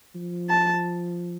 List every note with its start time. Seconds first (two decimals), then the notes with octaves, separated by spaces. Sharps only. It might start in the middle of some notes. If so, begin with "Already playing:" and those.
0.15 F3
0.50 A5